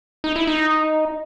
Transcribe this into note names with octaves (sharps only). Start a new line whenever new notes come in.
D#4
E4
D#4